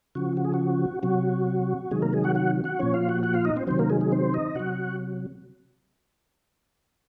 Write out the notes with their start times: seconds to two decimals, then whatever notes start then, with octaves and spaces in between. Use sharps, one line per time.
0.15 C#3 F3 F#4
0.37 F#4
0.44 G#4
0.54 F#4
1.03 C3 F#3 F#4
1.91 C3 D#3 F#3 G#3 G#4
2.02 A#3 A#4
2.13 G#3 G#4
2.24 F#4 F#5
2.35 F#4 F#5
2.64 F#4 F#5
2.79 A#2 F3 C#4 C#5
2.94 F4 F5
3.08 F#4 F#5
3.23 F#4 F#5
3.34 F4 F5
3.45 D#4 D#5
3.56 C4 C5
3.67 C3 D#3 F#3 C4 C5
3.79 A#3 A#4
3.90 G#3 G#4
4.01 G#3 G#4
4.12 C4 C5
4.34 D#4 D#5
4.55 C3 F#3 F#4 F#5